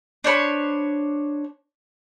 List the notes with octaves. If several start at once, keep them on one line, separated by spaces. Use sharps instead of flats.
D4 C5 C#5 B5